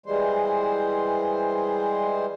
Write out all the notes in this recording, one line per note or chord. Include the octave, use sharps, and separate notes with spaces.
E3 G3 G#3 C5